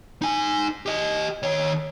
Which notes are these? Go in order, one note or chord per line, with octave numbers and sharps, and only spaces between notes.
D#4 G#5
G4 D#5
D#3 C#5